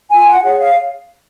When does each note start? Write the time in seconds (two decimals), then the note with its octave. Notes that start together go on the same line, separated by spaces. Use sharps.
0.10 F4 G#5
0.27 F#5
0.43 G#4 C#5 F#5
0.59 F5